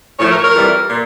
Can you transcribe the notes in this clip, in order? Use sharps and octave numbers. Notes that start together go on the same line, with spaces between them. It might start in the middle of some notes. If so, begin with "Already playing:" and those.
A2 F3 A3 C#5
A#4
C#5
A#4
F2 E3 G3
A#2